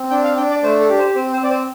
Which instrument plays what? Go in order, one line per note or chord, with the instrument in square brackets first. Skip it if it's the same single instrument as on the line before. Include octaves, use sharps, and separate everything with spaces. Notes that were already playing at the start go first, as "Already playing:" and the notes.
Already playing: [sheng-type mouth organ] C4
D4 G5
F5
D4 G5
D5
A3 C5
A4
G4
C5
C4 C5
C5
C4 D5
C5